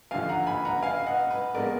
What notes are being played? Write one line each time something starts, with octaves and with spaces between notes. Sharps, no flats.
D#2 D3 F3 F5 G#5
F#5 A#5
G#5 B5
F#5 A#5
F5 G#5
D#5 F#5
B4
A#1 A#2 G#3 B3 A#4 D5